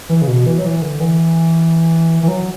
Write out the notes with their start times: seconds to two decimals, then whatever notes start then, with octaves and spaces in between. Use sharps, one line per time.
0.09 E3
0.22 C#3
0.28 B2
0.46 E3
0.58 F#3
0.64 E3
0.82 D3
1.00 E3
2.23 E3
2.28 F#3